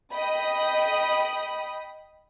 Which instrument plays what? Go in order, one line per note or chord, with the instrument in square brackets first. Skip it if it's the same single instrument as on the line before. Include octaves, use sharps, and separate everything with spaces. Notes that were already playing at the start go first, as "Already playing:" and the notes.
[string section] D#5 G5 B5 D#6